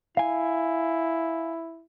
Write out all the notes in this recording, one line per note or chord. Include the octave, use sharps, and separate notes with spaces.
E4 F5 G#5